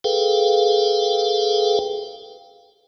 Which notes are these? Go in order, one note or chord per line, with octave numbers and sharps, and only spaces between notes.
G#4 A4 B4 F5 G5